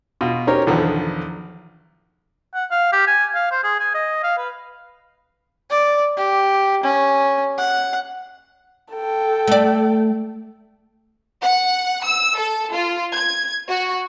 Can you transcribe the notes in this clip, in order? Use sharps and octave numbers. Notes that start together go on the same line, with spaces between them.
B2 F4 F#4
C#4 D#4 G4 A#4 C5 C#5
B1 E2 D3 D#3 F3 B3
F#5
F5
G4
G#5
F5
C5
G#4
G#5
D#5
F5
B4
D5
G4
C#4
F#5
A4 G5
A3 D5
F#5
E6
A4
F4
G#6
F#4